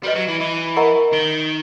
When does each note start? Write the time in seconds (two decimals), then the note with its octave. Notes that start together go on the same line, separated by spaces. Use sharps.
0.04 G3 F#4 B4 D#5
0.16 F#3
0.28 E3
0.40 E3
0.76 A#4 D#5 F#5 A#5 C#6
1.13 D#3